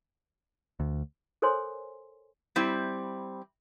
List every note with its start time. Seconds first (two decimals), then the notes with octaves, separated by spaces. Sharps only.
0.80 D2
1.42 A4 A#4 C5 C#5 G#5 C6
2.56 G3 C4 E4